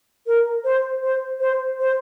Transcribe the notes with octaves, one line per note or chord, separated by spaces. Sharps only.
A#4
C5
C5
C5
C5